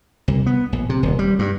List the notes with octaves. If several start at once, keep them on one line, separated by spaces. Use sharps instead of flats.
C2
B3
A#1
C3
D#1
G3
G2